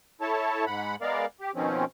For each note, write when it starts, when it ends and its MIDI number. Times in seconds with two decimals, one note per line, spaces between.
0.21 0.65 64
0.21 0.65 69
0.21 0.65 73
0.21 0.65 81
0.66 0.96 44
0.66 0.96 78
0.66 0.96 83
1.01 1.26 56
1.01 1.26 59
1.01 1.26 70
1.01 1.26 74
1.01 1.26 77
1.41 1.51 67
1.55 1.85 47
1.55 1.85 51
1.55 1.85 53
1.55 1.85 60
1.55 1.85 61